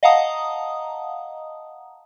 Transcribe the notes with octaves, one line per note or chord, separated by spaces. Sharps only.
D#5 F5 F#5 A5 A#5 D#6